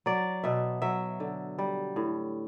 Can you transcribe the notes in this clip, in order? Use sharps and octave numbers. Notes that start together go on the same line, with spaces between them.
F#3 D5
B2 E5
F#3 E5
D3
G3
A2